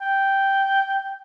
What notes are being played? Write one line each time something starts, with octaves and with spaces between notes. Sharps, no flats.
G5